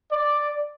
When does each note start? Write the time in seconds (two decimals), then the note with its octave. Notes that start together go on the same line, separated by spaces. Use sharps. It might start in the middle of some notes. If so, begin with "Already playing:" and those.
0.10 D5